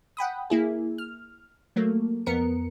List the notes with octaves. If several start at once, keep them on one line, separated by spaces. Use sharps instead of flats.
F#5 G5 B5 D#6
A#3 E4 G#4
F6
F#3 A3 A#3
F2 B3 A#4 C#7